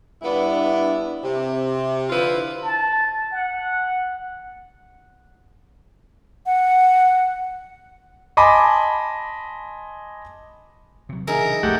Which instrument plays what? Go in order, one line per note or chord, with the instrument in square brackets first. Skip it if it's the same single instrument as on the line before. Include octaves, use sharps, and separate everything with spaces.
[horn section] G2 B3 D4 E4
C3
D3 F3 E4 F4 B4
[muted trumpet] A5
F#5
[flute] F#5
[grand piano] D#5 G#5 A5 B5 C6 D6
[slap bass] C3 F#3
[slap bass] C#3 E3 [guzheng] D#4 G#4 E5 [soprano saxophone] A#4
[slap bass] F1 B1 [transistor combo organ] A3 G4 F#5